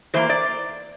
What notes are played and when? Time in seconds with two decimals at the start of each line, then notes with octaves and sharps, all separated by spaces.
0.14 E3 A#3 C5
0.29 D5